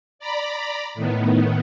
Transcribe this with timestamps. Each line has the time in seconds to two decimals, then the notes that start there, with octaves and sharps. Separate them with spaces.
0.19 D5 A#5 B5
0.95 A2 D#3 B3